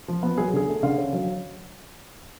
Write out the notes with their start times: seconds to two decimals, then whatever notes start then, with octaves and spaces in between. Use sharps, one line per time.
0.08 F3
0.23 B3
0.38 F#3 G#4
0.53 D3 G#4
0.68 A3
0.83 D3 F5
0.98 C#4
1.13 F#3